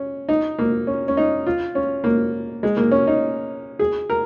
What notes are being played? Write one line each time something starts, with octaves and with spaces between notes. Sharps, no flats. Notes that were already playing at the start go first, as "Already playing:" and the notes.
Already playing: C#4
D#4
A#3
C#4
C#4
D#4
F4
C#4
A#3
G#3
A#3
C#4
D#4
G#4
A#4